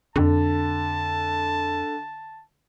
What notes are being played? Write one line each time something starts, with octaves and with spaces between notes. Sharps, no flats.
F2 D3 A5